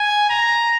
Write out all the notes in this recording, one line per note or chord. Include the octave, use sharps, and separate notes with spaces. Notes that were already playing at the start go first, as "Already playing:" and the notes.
Already playing: G#5
A#5